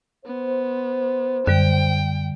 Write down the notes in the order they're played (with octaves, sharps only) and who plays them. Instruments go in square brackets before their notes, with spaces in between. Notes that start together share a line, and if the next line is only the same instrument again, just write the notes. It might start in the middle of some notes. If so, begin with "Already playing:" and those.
[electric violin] B3 [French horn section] C5
[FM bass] F#2 [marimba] D3 G3 [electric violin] G5